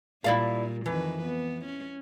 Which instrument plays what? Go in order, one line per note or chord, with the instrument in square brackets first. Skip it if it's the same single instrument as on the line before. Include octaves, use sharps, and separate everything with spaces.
[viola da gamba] A#2 G3 [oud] E4 D5 F5
[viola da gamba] F2 D#3 B4 [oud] E3
[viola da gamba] B3
C#4